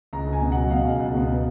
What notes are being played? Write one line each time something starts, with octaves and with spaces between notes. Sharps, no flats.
C#2 A#5
C#2
G#5
B2
F#3 F#5
B2 F5
C#2
C#2
B2
B3